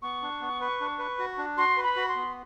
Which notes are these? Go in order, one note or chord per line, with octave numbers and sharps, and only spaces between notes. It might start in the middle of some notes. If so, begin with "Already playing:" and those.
B3 C#6
D4
B3
B4
D4
B4
F#4
D4
F#4 C6
B4
B5
F#4
C6
B3